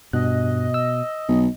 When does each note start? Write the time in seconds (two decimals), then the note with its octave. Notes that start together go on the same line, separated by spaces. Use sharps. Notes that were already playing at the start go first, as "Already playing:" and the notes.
0.13 G2 B2 D#5 F#6
0.74 E6
1.28 B1